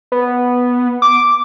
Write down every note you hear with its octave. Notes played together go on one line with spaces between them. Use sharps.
B3
D6